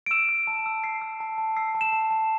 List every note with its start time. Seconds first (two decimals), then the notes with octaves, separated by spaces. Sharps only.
0.06 D7
0.11 E6 E7
0.29 E6
0.47 A5
0.66 E6
0.84 E6 C7
1.02 E6
1.20 A5
1.38 A5
1.56 E6 C7
1.75 A5
1.81 E7
1.93 A5
2.11 A5